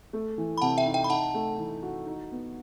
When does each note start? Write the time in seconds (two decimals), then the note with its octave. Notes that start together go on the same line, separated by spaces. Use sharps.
0.13 A3
0.38 E3
0.58 B5
0.61 C3 F#5 A5
0.78 E5 G5
0.86 D#4
0.94 E5 G5
1.04 B5
1.10 D#4 F#5 A5
1.34 A3
1.58 E3
1.83 F#4
2.07 D#4
2.31 B3